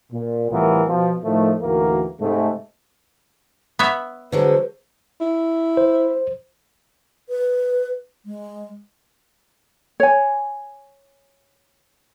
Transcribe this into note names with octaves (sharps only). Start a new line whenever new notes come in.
A#2
C2 A2 E3 B3 F4 A#4
B2 F3
A2 D#3 F3 A3
D2 G#2 E3 A#3 F#4 A#4
G#2 C3 G#3 A3
B3 C#5 E5
D3 F#3 G#3 B4 C5
E4
C5
B4
G#3
C#5 G#5